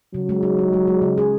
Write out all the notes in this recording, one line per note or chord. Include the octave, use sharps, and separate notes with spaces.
C#3 F#3
G#3
D#4
D#4
G#3
G#3
C#3
G#4